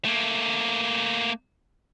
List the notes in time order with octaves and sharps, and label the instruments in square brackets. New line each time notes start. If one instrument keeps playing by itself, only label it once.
[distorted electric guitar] A3 A#3